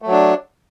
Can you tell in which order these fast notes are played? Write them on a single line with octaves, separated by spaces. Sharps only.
A3 F#3 D4